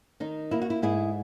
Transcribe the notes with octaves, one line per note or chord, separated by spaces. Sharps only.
D#3 D#4
A#3 E4
F#4
E4
G#2 E4 G#4